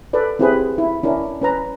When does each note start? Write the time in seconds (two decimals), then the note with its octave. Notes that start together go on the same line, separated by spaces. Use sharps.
0.13 A4 B4 D5
0.39 C4 E4 G4 G#4 B4
0.78 E4
1.03 C#4 D4 E4 A#4
1.42 C#4 B4 A#5